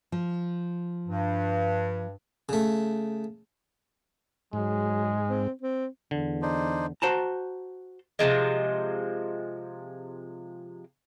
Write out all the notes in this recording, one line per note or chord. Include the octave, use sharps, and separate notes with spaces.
F3
G2
C#3 A3
G#2 F#3 G#3
C4
C4
E2 D3
D4 D#4 C5
F#4 C5 A5 A#5
C3 D#3 F3 G#3